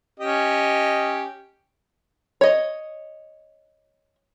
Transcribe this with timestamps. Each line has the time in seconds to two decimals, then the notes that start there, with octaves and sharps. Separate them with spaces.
0.20 C#4 G4 D#5
2.41 C#5 D#5